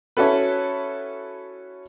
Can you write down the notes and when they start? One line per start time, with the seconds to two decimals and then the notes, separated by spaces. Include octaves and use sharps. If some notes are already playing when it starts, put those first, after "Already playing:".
0.17 C#4 E4 F#4 A4 B4